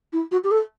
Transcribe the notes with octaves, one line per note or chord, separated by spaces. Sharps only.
E4
F#4
G4
A4